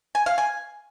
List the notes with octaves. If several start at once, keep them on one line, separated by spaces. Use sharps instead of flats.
G#5
F5
G#5